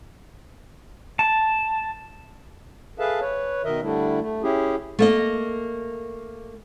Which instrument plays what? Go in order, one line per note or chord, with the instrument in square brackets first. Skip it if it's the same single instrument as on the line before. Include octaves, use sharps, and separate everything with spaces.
[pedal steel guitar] A5
[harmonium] G#4 A4 B4 E5 F5 A5
B4 C#5
B2 D#3 A#4 D#5 E5
D3 G3 A3 D4 E4
A3
C#4 E4 G4 G#4
[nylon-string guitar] A3 A#3 D#5